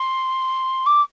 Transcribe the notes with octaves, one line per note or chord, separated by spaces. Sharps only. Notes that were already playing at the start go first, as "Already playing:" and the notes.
Already playing: C6
D6